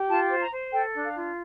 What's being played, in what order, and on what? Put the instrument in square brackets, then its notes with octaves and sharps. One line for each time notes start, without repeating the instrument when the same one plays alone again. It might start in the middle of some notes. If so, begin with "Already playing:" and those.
Already playing: [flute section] G4
F4 A5
C5
A#5
C5
A4 G5
D4
F5
F4